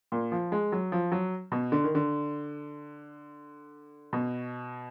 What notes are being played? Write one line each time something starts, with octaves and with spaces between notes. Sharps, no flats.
A#2
F3
G#3
F#3
F3
F#3
B2
D3
D#3
D3
B2